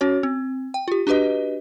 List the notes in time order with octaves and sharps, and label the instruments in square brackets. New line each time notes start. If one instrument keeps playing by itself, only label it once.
[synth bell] C#4 F#4 C#5
C4
G5
F4 G4
D4 F#4 G4 B4 D#5